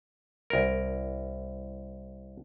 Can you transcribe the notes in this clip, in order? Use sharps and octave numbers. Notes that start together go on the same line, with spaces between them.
C2 A#4